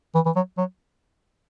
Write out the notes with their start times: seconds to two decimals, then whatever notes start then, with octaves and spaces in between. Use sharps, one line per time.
0.15 E3
0.26 E3
0.36 F#3
0.58 F#3